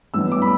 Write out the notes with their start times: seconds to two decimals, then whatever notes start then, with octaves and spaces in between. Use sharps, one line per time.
0.14 A1 G2 E3 B3 E6
0.32 D6
0.42 B5